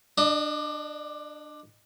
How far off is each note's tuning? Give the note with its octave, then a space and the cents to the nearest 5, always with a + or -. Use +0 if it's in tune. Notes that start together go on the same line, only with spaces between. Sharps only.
D4 +15 D#5 -30